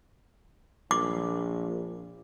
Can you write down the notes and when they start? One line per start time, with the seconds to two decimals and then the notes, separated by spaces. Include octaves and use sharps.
0.91 A#1 D6